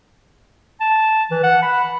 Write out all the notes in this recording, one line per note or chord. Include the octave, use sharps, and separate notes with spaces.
A5
E3
F#5
B5